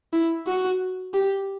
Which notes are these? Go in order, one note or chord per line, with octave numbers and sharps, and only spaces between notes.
E4
F#4
G4